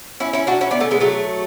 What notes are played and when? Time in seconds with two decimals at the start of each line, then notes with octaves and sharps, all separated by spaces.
0.20 C#4 E4
0.33 C#4 E4
0.47 D4 F#4
0.61 C#4 E4
0.71 B3 D4
0.80 A3 C#4
0.91 G#3 B3
1.00 F#3 A3